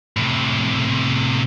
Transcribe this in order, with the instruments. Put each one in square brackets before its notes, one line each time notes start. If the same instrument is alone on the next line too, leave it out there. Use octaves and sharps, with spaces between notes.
[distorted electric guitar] A2 C3